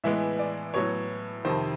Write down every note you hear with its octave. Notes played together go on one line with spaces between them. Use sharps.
A2 E3 G#3 B3 E5
D5
A2 F#3 B3 C#5
F2 C3 D#3 C5